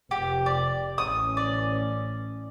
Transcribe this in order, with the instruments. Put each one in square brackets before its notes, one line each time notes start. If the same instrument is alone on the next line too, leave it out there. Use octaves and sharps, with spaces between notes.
[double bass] F1 C3 [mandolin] G4
[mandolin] D5
[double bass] A1 C#4 [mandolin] D#6
[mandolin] D5